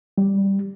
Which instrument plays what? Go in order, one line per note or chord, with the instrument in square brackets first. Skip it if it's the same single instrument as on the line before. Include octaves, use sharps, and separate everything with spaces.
[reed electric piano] G3